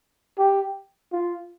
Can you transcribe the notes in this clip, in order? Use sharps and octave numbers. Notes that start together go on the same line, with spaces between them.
G4
F4